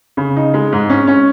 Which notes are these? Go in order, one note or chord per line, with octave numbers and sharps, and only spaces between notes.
C#3
D#4
G#3
G#2
C#4
C#4